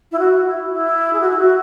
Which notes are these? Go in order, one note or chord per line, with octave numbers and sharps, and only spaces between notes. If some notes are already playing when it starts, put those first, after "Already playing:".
E4
F#4
E4
E4
G#4
F#4
E4
F#4